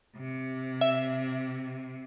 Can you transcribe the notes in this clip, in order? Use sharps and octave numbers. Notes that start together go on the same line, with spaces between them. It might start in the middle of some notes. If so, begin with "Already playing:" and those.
C3
E5